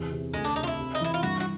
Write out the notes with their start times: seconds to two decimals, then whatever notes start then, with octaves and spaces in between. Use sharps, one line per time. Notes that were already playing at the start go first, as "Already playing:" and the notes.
Already playing: E2 C3
0.11 C3
0.33 D2 G#3
0.44 D4
0.56 C3 D#4
0.63 F4
0.67 E4
0.78 C3
0.95 D#4
1.01 E3 E4
1.14 F4
1.23 G2 F#4
1.40 F#4